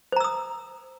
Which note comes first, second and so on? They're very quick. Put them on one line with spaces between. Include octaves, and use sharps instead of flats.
C5 A#5 E6 D#6